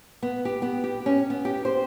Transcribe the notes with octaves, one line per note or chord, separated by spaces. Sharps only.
B3
G4
B3
G4
C#4
B3
G4
C5